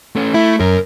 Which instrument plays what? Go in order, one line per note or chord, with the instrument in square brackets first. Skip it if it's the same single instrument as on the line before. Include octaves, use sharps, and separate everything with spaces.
[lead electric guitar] A3 C#4
[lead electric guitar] A3 [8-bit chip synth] E4
[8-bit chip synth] F#2 [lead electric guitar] A#4